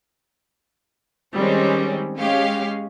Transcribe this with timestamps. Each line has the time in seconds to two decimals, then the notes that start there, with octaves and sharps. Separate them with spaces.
1.35 D#3 G3 G#3 C4 C#4
2.18 G#3 C#4 G4 F5